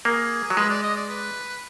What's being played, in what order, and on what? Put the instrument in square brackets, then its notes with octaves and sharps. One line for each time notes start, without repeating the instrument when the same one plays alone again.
[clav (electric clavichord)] A#3 [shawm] G#4
[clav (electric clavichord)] F#3
[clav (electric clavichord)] G#3 [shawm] B4
[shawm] D5
D#5
D5
B4